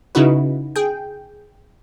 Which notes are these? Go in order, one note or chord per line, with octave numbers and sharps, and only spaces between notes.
C#3 D#4 E4 F#4 B4
G#4 G5